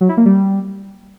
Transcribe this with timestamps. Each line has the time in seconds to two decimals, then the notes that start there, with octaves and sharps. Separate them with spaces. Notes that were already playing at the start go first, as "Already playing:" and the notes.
0.01 F#3
0.09 E4
0.17 A#3
0.26 G3